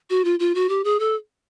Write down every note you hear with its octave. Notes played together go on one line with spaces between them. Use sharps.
F#4
F4
F4
F#4
G4
G#4
A4